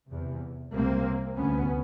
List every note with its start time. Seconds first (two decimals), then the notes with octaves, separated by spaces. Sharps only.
0.10 E2 C3
0.73 C2 C3 A#3 C4
1.37 D2 C3 B3 C#4